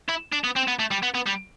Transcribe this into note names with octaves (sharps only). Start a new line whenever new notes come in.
E4
D4
B3
C4
B3
A3
G3
B3
B3
G3